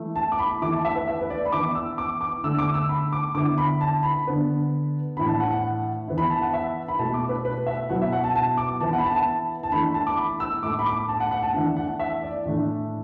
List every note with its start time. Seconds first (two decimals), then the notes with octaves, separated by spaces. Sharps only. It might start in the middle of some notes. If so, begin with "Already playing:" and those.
Already playing: E3 A3 E4
0.16 A5
0.32 D6
0.39 B5
0.62 E3 A3 E4 D6
0.73 A5
0.85 E5
0.95 B4
1.08 E5
1.21 B4
1.30 D5
1.45 B5
1.52 E3 B3 E4 D6
1.75 E6
1.98 D6
2.21 D6
2.44 D3 A3 D4 E6
2.58 D6
2.74 E6
2.89 B5
3.12 D6
3.35 D3 B3 E4 D6
3.58 B5
3.81 A5
4.03 B5
4.26 D3 B3 D4
5.17 A2 E3 D4 B5
5.28 A5
5.40 F#5
5.51 F#5
6.08 E3 B3 E4
6.18 B5
6.30 A5
6.41 F#5
6.54 E5
6.88 B5
6.99 B2 A3 E4 A5
7.14 D6
7.29 B4
7.45 B4
7.67 E5
7.90 B2 F#3 B3 E4 F#5
8.02 E5
8.13 F#5
8.24 A5
8.36 A5
8.57 D6
8.81 E3 B3 E4 A5
8.93 F#5
8.98 B5
9.04 A5
9.15 A5
9.63 A5
9.72 E3 A3 D4 B5
9.94 A5
10.07 D6
10.18 B5
10.40 E6
10.63 A2 A3 E4 D6
10.79 B5
10.86 D6
11.08 A5
11.20 F#5
11.31 F#5
11.42 A5
11.53 E3 A3 D4 F#5
11.77 F#5
12.00 E5
12.23 D5
12.45 A2 E3 A3 D4